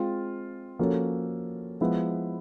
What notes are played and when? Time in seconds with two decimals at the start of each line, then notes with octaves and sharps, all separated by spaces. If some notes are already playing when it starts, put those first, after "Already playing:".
Already playing: G#3 C4 F4
0.79 F3 A#3 C#4 F#4 A4
1.81 F3 G#3 B3 E4